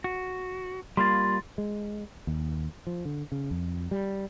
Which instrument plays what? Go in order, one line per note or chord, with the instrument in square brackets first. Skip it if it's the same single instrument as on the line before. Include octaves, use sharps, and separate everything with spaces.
[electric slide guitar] F#4
[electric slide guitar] G3 A#3 F4 [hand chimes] C6 A6
[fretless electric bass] G#3
D#2
F3
D3
C#3
F2
G3